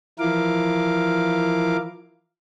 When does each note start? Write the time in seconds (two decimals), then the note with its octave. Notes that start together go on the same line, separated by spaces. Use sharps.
0.19 E3 F3 E4 A#4 F5 D6